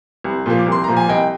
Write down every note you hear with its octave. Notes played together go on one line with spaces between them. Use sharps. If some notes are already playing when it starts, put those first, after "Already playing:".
C2
A#2 F3 A#3
D6
C2
C6
A#2 F3 A#3 A#5
G#5
C2 D#5 G5